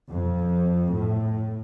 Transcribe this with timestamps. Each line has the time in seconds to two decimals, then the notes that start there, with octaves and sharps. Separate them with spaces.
0.11 F2
0.95 A2